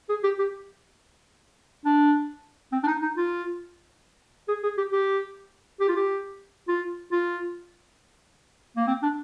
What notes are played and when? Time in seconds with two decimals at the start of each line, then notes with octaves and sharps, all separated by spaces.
0.09 G#4
0.24 G4
0.39 G4
1.85 D4
2.72 C4
2.84 D4
2.87 D#4
3.02 D#4
3.17 F4
4.49 G#4
4.63 G#4
4.78 G4
4.92 G4
5.80 G4
5.89 F4
5.96 G4
6.68 F4
7.12 F4
8.77 A#3
8.88 C4
9.03 D4